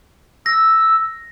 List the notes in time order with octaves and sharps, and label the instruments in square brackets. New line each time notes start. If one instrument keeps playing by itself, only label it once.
[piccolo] E6 [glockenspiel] A#6